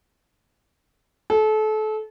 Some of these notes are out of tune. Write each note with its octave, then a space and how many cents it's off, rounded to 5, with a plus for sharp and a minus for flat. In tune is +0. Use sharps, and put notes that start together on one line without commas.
A4 -30